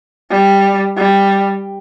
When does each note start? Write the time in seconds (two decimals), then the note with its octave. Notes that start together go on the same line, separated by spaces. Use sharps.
0.31 G3
0.98 G3